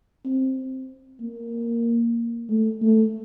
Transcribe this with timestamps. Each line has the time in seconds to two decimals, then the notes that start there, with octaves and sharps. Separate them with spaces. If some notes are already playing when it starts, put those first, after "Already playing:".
0.25 C4
1.21 A#3
2.50 A3
2.82 A3